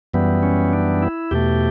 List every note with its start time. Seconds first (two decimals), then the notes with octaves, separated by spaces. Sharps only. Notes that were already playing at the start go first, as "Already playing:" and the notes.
0.14 F#2 E3 G3 B3
0.43 C#4
0.73 D4
1.02 E4
1.31 E2 B2 A3 G4